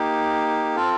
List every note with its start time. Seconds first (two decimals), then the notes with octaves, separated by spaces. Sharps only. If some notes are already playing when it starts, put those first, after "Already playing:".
Already playing: A#3 D#4 G4
0.76 C4 F4 A4 F5